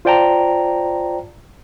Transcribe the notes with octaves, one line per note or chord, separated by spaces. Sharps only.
F4 C5 D5 G5 A5 A#5